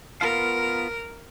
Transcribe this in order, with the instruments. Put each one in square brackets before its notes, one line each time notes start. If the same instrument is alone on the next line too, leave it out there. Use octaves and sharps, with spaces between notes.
[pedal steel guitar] B3 F4 F5 [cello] A#4